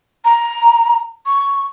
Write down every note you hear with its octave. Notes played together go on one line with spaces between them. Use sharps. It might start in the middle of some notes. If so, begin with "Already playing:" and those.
A#5
C#6